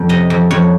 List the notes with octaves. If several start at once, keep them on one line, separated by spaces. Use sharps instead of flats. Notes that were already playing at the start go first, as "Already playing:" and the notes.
Already playing: F2
C3 D#5
F2
F2 C#5